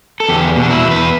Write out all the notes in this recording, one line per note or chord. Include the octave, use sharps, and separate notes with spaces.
A4
E2 G4
B2
D4
E4
E2
B4